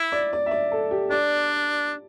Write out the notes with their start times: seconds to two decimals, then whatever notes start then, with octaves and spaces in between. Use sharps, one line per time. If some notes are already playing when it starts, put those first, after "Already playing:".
Already playing: E4
0.12 D5
0.33 D5
0.46 E5
0.51 D5
0.71 A4
0.91 G4
1.11 D4 D5